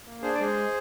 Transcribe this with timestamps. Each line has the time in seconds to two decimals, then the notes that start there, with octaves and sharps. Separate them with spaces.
0.05 A#3
0.22 D4 G#4 C5
0.35 D5
0.39 G#3 G#4 C5